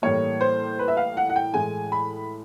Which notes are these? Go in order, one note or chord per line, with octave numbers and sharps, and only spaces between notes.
A2 E3 G3 A#3 C#5
C5
B4
E5
F5
F#5
F#5
G5
A2 E3 G#3 G#5
B5